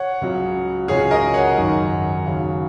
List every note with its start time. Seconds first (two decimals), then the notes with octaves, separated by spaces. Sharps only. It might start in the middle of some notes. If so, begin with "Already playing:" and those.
Already playing: C#5 F#5
0.21 C#2 C#3 F#3
0.88 C#2 C#3 F#3 G#4 C#5
1.11 A#4 D#5
1.34 C#5 F#5
1.56 G#1 F#2 D#3 F#3
2.24 D#2 C#3 F#3